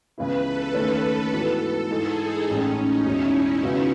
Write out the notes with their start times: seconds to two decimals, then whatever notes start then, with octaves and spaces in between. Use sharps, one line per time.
0.18 C#2 C#3 E3 B3 E4 B4
0.47 A4
0.75 D#2 D#3 A3 C#4 A4
1.32 G#2 E3 B3 F#4
1.90 G#2 E3 G#3 D#4 G#4 A4
2.19 D#4
2.48 A1 A2 G#3 C#4 D#4 G#4
2.77 D#4
3.05 E2 B2 G#3 C#4 E4
3.63 C#2 C#3 F#3 B3 F#4